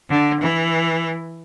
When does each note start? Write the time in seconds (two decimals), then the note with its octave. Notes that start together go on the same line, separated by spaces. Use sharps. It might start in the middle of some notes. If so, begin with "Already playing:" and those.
0.09 D3
0.41 E3